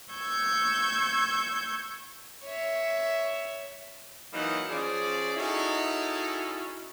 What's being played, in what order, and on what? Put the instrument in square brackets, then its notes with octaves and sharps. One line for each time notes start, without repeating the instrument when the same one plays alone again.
[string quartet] C#6 E6 G6 G#6
[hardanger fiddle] C#5 E5
[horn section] E3 F#3 A#3 D#4 D#5 F#5
F3 C#4 G#4 D5
C#4 D#4 E4 F#4 G#4 A4